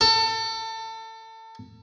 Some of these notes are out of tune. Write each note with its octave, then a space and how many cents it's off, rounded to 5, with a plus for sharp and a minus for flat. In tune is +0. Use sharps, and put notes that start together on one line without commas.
A4 +30